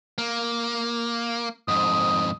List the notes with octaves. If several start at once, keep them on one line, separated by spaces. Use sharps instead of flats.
A#3
F2 G#2 D#6